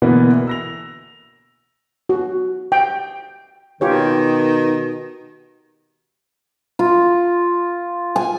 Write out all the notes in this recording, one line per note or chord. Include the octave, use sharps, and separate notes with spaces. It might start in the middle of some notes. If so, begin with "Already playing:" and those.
B2 D3 E3 A#3 B3
E6 A#6 F7
F#4
G5
B2 D#3 F4 G4 C#5
F4
G#5